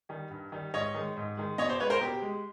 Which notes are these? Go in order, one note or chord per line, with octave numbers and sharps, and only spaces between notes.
D#3 G3
G2
D#3 G3
G#2 C#5 D#5
D#3 G#3
G#2
D#3 G#3
B2 C#5 D#5
C5 D5
G#3 B4 C#5
A#4 C5
B2 G4
G#3